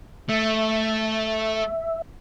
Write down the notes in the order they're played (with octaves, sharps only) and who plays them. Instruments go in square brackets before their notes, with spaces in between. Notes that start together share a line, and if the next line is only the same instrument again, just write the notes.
[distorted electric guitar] A3 [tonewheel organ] E5